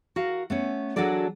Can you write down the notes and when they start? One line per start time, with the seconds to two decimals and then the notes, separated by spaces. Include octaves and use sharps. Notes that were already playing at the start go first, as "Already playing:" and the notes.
0.16 F#4 A#4 F5
0.50 A3 B3 C#4
0.96 F#3 D4 F#4 G#4 A4 D5